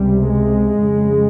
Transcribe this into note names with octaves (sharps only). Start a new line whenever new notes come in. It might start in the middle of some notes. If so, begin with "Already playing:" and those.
Already playing: C#2 C3 G3
G#3
F2 C#3